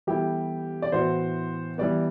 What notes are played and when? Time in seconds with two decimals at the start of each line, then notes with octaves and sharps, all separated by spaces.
0.07 E3 G3 B3 E4 G4 A4
0.82 D5
0.92 A2 E3 B3 F#4 C5
1.78 E3 G3 B3 D5